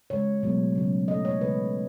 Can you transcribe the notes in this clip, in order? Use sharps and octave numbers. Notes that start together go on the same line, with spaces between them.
C#3 G#3 C#5
B2 F#3 A3
C#3 F#3 A3
B2 F#3 A3 D#5
C#5
C#3 E3 G#3 B4